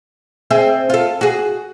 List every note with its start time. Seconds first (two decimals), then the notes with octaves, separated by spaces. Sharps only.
0.50 C4 G#4 E5
0.90 F4 A4
1.21 F#4 G#4